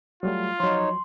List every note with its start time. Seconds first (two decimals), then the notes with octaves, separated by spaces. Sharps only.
0.23 F#3 G3 A3 F4
0.60 F3 F#3 D#4 C#5 C6